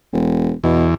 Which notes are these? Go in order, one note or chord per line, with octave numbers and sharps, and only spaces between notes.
E1
E2 B2